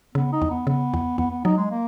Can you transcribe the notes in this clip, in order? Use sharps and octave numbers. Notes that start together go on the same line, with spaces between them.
C#3 B3
D#4
E2
B3
C#3 B3
E2
E2 B3
B3
F#3 D#4
G#3
A#3